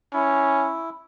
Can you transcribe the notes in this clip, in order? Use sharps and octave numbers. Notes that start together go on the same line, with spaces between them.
C#4 E4